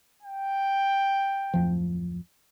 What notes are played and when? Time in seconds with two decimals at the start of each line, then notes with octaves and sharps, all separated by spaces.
0.22 G5
1.54 D1 F2 F3